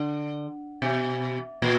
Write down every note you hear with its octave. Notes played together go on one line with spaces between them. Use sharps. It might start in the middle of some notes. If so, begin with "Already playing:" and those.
Already playing: D3
B2
A#2